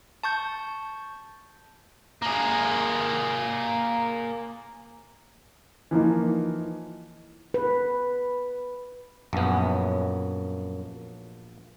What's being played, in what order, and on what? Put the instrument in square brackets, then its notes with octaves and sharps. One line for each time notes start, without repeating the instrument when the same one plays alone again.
[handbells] A5 C#6 G6
[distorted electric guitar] A#3 G#4
[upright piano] E3 F3 A#3 D#4
[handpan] B4
[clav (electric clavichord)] A#1 B3 [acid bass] F#2